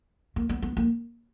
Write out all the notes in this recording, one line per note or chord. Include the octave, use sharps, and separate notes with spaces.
A#3
B3
B3
A#3